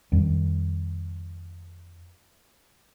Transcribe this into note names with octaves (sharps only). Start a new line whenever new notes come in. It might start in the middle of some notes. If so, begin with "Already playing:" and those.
F2 D#3 G3